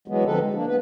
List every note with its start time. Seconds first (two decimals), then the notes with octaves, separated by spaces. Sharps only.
0.08 E3 F#3 G#3 B3
0.25 D3 F3 C4 A4 B4
0.39 E3 G#3
0.54 A#3 D4
0.67 B3 B4